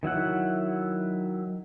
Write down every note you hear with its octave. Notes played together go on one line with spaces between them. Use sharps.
D#3 F#3 E4 F#5